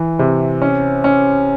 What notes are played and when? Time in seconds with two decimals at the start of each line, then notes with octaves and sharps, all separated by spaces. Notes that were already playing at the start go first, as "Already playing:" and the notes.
Already playing: E3
0.19 C3
0.62 C#4
1.04 C#4